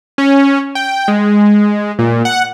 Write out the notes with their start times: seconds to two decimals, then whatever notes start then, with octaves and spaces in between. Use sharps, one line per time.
0.18 C#4
0.75 G5
1.08 G#3
1.99 A#2
2.25 F#5